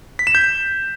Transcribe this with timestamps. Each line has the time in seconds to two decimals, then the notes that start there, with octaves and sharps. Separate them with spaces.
0.19 B6
0.27 E7
0.35 G6